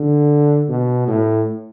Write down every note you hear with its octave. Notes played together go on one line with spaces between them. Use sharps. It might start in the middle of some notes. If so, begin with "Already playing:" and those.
Already playing: D3
B2
A2